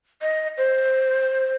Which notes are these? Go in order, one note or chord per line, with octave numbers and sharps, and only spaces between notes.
D#5
C5